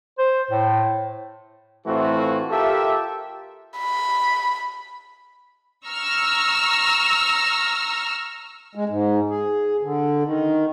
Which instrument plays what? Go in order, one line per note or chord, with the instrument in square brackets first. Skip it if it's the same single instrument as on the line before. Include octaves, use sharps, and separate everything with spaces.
[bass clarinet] C5
A2
[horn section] A2 E3 A3 C4 F4 F#4
F4 G4 A4 A#4 E5
[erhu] B5
[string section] A#5 C#6 E6 F6
[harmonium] G#3
G#2
G#4
D3
D#3